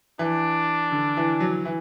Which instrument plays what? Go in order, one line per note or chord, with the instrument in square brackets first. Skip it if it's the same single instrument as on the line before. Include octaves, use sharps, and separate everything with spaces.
[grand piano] E3 [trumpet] D4
[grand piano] D3
E3
F#3
E3